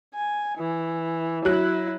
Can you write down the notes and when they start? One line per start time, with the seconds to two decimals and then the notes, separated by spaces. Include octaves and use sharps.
0.14 G#5
0.58 E3
1.45 F#3 E4 F#6